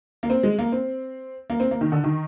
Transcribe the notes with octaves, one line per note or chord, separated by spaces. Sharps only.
A#3
C4
G#3
A#3
C4
A#3
C4
A#3
D#3
D3
D#3